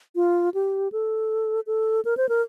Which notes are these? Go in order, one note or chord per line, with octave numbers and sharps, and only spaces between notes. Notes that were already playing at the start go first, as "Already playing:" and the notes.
F4
G4
A4
A4
A#4
C5
A#4